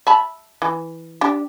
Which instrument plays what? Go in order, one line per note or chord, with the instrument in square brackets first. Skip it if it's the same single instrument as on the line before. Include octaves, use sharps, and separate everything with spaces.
[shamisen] E5 A5 B5
E3
D4 G4